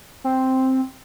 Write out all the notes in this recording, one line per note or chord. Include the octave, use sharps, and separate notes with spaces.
C4